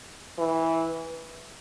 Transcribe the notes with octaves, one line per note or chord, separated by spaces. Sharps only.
E3